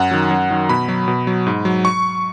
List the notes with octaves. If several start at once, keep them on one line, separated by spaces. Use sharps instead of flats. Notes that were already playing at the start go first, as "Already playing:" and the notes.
Already playing: F#2 F#5
D#3 F#3
F#2
D#3 F#3
B2 B5
F#3
B2
F#3
G#2
F#3
C#6